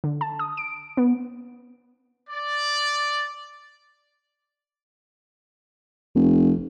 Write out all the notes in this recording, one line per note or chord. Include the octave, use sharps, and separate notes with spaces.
D3
A5
D#6
D7
B3
D5
F1